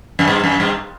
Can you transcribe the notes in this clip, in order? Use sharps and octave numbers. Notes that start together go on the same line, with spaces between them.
F#2
G2
F#2
G2